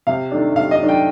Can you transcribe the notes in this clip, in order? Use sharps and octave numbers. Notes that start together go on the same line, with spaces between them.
C3 F5
D#3 A3 D4
C3 F5
D#5
D#3 A3 D4
G5